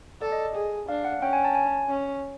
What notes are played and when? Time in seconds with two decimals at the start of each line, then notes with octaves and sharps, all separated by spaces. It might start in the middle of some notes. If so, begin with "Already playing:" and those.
0.22 A4 D5
0.32 D#5
0.55 G#4
0.89 D4 F5
1.05 F#5
1.22 C#4 G5
1.33 G#5
1.45 A5
1.55 G#5
1.89 C#4